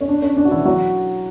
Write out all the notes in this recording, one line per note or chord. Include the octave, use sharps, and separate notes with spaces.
C#4
D4
C#4
D4
F#4
E3 E4
F#3 F#4